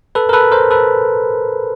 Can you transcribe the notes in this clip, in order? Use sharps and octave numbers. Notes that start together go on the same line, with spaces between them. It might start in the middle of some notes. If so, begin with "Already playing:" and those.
A4 B4
A#4
A4 B4
A#4 C5
A4 B4